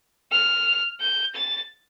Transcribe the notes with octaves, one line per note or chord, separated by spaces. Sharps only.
F6
G6
A6